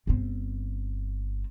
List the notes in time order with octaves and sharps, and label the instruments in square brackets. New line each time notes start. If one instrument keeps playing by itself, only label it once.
[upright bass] G1 C4